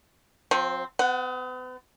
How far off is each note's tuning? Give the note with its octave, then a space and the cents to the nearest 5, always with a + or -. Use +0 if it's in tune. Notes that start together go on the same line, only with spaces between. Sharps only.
F3 +40 C4 +0
B3 +45 F#5 +0